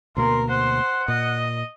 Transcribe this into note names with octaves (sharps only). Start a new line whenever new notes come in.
D2 B2 A#3 A#4 C6
C5 F#5
A#2 D#5